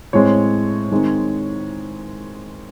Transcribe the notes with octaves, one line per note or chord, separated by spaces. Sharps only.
A2 G#3 C4 C#5
D#3 G#3 C4